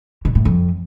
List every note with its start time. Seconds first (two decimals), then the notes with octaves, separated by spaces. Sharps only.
0.25 B2
0.35 A2
0.45 F2